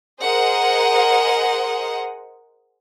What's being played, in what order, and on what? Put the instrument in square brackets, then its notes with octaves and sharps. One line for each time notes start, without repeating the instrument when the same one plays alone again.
[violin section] G#4 A#4 C5 D#5 F#5